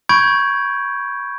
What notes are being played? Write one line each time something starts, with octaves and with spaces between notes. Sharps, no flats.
B5 C#6 G6 G#6 D7